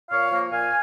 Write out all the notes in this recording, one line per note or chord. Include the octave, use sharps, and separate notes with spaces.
A#2 C#5 F5
F3 A#3
A#2 F5 G#5